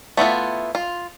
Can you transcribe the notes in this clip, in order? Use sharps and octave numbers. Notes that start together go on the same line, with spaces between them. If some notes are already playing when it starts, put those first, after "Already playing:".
A3 B3 E4 F4
F4